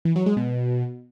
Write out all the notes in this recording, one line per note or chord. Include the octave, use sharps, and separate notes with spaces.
E3
F#3
G#3
B2